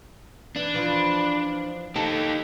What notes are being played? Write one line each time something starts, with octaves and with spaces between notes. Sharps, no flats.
E3 D4
E3 F3
D#4 G4 A4